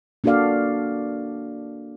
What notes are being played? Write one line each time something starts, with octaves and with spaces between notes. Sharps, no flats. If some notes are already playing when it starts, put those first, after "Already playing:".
A#3 D4 F#4 A4 D5 F5